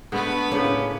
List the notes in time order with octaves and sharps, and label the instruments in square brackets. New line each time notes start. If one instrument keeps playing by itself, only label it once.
[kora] D3 G#3 A3 [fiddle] B3 B4
[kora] A2 C#3 A#3 [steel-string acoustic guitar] C#4